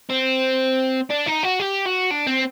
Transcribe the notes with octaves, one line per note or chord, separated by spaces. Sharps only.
C4
D4
D#4
F#4
G4
F#4
D4
C4